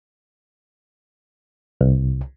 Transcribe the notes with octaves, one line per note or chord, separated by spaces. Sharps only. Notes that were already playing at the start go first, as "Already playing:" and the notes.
C2